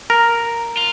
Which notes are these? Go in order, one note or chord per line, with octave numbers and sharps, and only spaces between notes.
A#4
F4